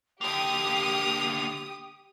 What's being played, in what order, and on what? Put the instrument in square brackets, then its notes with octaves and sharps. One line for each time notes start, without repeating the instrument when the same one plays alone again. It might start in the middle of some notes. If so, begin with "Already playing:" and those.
[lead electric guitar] D3 A#3 [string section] G4 D#6 [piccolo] F7